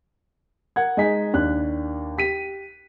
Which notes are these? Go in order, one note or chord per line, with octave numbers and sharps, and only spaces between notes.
A#4 F#5 G#6
G#3 D#4 D#5 G#5 B6
D#2 D4 F#6
G4 B6 D#7